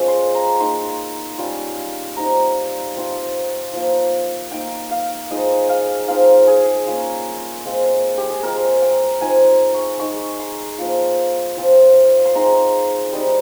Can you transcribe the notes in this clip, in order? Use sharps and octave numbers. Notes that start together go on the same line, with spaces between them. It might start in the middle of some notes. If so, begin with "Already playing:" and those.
Already playing: F3 G#3 C#4 F4
C6
A#5
A#3 D#4 C6
G3 C#4 F4
G3 C4 D#4 A#5
F3 C4 F4
F3 A#3 F4
A#3 D#4 G5
F5
F3 G#3 D#4 D#5
F5
F3 C4 D#4 F5
G#4
A#3 C#4 F4
G#3 C4 F4
G4
G#4
F3 G#3 C4 A#4
G5
F3 C4 D#4 G#5
C#6
G#3 D#4 C#6
C6
F3 A#3 F4
F3 C4 F4
C6
G#3 C4 D#4 A#5
G3 C4 D#4